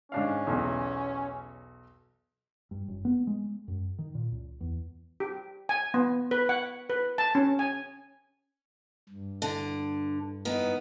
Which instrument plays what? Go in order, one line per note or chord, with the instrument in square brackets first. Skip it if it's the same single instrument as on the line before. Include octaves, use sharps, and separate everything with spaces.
[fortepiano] G#2 D4 F5 [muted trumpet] C#4
[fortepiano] B1 E2
[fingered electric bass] G2
F#1
B3
G#3
F#2
D#3
A#2
C#2
E2
[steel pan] G4
G#5
B3
B4
F#5
B4
A5
C#4
G#5
[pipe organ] G2
[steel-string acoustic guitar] D3
D#3 B3